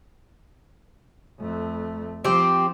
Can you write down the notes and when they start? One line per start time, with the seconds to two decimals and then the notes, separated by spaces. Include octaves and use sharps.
1.39 F2 A3
2.25 F3 C4 G4